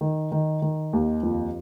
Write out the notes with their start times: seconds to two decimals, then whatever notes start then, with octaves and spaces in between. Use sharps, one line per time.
0.01 D#3
0.32 D#3
0.62 D#3
0.93 D#2
1.23 F2